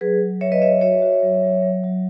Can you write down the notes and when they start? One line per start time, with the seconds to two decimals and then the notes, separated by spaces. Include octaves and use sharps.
0.01 F#3 G#4 B4
0.21 F#3
0.41 F#3 C#5 E5
0.52 B4 D#5
0.62 F#3 C#5 E5
0.81 F#4 C#5 E5
1.02 F#4
1.23 F#3
1.43 F#3
1.62 F#3
1.84 F#3